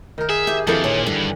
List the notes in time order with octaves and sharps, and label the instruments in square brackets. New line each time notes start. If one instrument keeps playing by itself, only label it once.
[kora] D#3 A#4
[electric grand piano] G#4 [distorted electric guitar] E5
[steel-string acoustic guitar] C3 E4 [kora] G4
[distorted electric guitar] F2 [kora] D#3 E3 D4 [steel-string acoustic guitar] A4 F5
[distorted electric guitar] A#2 [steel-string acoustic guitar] C#5
[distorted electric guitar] G2 [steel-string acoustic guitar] D3